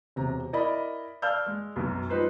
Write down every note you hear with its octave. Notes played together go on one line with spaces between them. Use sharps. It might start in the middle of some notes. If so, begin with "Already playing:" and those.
E1 C3 A#5
E4 A#4 D5 D#5 B5
D5 F5 A5 E6 F6 G6
G#3
B1 F#2
F3 G3 D#4 B4 C5